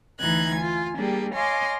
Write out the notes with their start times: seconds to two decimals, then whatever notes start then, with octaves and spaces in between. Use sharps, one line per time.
0.19 D2 E3 D#4 F#6 G#6
0.56 F4 G#5
0.96 G3 A#3 D4 G4 G#4
1.34 C#5 D#5 F5 G#5 C6 D6